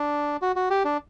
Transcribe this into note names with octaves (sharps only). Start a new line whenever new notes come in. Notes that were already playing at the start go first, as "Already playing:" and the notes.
Already playing: D4
F#4
F#4
G4
D4